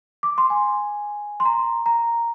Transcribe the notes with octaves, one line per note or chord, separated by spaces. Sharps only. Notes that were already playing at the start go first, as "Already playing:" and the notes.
D6
C6
G#5
C6
A#5
A#5